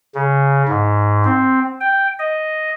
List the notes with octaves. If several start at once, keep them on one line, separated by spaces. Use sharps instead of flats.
C#3
G#2
C4
G5
D#5